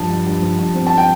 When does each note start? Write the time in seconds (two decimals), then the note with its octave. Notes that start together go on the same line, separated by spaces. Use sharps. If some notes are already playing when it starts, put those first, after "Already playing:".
Already playing: G2 F3 A5
0.10 G2
0.27 G2
0.42 F3
0.59 G2
0.75 C4
0.87 A5
0.98 G5